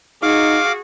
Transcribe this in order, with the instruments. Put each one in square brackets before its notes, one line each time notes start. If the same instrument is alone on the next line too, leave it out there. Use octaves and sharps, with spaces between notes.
[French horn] D#4 [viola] F#4 G#4 [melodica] F5 D6